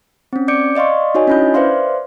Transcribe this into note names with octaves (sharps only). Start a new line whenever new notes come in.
C4 C#4
D5 D6 G6 C#7 D7
D5 D#5 F5 C6 C#6
D#4 F#4 C#5 D#5 G#5
C#4 D4 E4 B5 G6
B4 C5 D5 E5 F5 C6